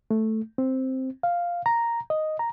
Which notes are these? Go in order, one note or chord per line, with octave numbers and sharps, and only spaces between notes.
A3
C4
F5
A#5
D#5
A#5